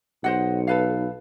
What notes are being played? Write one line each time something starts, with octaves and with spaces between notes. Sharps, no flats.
B1 C5 D#5 F#5
A4 B4 F5